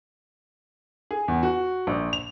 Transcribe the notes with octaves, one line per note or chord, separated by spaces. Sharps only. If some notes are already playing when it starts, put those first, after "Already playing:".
G#4
E2
F#4
A#1
F7